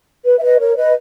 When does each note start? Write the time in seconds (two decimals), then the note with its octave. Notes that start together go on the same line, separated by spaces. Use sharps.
0.25 B4
0.38 E5
0.42 B4 D#5
0.59 A#4 C#5
0.77 B4 D#5